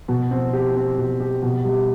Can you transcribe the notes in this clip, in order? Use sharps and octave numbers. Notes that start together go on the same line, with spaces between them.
B2
C4
G4
C4
B2
G4
B2
G3